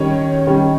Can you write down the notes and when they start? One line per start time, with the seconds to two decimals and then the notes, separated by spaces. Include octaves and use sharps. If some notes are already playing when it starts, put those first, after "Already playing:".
Already playing: D#3 G3 C#4 C#5
0.47 D#3 G3 C#4